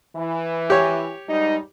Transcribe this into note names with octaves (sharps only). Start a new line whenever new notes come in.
E3
G4 C#5
G#2 G3 D#4